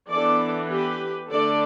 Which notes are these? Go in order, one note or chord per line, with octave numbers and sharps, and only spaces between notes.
E3 B3 D4 A4 D5
G4 B4
D3 A3 D4 A4 D5